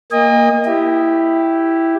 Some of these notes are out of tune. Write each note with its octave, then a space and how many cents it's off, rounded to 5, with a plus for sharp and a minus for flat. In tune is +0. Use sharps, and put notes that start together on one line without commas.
A#3 +0 D#5 +0 G#5 -45
E4 +0 G4 +0